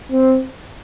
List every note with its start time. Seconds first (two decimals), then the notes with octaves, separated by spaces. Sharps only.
0.12 C4